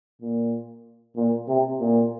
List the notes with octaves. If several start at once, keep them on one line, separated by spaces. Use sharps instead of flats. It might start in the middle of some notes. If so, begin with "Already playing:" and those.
A#2
A#2
C3
A#2